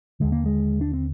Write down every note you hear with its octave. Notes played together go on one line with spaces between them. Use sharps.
D#2 D3 G#3
A#3
G#3
D4
C4